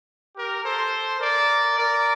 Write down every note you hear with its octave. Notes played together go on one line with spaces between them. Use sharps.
G4 A#4
A4 C5
A#4 D5
A#4 D5